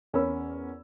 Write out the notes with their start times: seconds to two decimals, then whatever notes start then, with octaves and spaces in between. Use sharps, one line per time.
0.13 E2 C#4 A#4 C#5 B5 E6